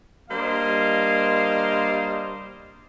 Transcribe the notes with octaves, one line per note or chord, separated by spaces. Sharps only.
G3 A#3 D4 C5 D#5 F5